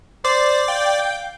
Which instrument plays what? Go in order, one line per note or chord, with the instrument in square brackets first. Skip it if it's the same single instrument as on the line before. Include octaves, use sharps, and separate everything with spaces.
[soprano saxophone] C5 [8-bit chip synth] D5
[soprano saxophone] F5 [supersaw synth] G5